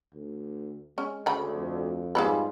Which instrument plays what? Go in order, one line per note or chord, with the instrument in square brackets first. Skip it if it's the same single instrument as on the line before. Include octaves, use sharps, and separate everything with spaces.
[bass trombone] D2
[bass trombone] G#3 [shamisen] C#4
[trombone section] D2 [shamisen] C#3 B5
[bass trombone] F2
[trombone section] G#2 G3 F4 [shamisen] G#4 A4 B4